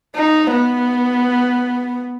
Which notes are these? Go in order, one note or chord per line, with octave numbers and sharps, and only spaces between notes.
D#4
B3